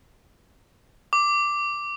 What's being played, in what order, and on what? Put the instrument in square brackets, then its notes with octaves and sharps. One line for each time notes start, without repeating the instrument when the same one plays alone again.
[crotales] D6